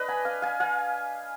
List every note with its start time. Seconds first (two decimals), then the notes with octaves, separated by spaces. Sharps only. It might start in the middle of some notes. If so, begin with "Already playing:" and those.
Already playing: D4 B4 D#5
0.08 G#5 B5
0.25 F5 G#5
0.42 F5 G#5
0.60 F5 G#5